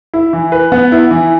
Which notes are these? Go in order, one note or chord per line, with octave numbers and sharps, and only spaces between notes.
E4
E3
B4
B3
E4
E3